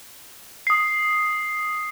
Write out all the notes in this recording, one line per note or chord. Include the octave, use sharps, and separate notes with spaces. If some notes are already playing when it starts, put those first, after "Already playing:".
D#6 C7